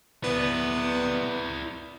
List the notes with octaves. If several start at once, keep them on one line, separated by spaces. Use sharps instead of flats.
B3 E4 D5